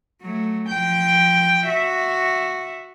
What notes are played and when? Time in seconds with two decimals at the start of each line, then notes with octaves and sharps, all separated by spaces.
0.22 F#3 A3
0.68 F3 G5
1.68 F#4 E5